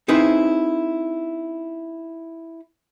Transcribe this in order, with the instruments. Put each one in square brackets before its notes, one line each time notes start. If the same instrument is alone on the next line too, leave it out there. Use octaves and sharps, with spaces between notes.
[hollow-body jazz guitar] C4 D#4 E4 G#4 B4 C5